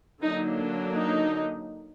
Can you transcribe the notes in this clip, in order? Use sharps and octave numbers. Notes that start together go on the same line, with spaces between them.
D3 F#3 A#3 D4 D#4
D#4